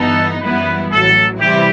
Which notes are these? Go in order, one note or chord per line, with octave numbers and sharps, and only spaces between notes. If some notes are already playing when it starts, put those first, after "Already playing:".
Already playing: G1 G2 E3 B3 D#4 A4
F#2 E3 G3 B3 E4 B4
A1 A2 F#3 A4
C3 E3 G3 C4 E4 G4